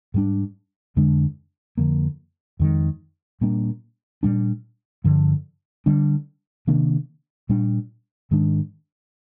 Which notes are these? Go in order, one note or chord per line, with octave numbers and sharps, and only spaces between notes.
G#2 G3 D4
F2 D3 G#3 D4
F2 D3 F3 A#3
F2 D#3 G#3
A#2 G3 A#3 D4
A#2 G3 D4
G2 D3 F3
D3 G3 D4
C3 D#3 A#3 D4
A#2 G3 D4
G#2 D#3 G#3 D4